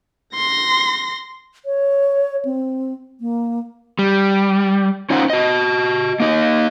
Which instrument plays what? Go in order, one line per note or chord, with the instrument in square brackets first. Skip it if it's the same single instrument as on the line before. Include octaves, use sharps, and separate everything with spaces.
[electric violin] C6 A#6
[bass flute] C#5
C4
A#3
[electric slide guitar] G3
C#4 D#4 F4 C5 F#5
F#4 D#5
A#3 D#4 D#5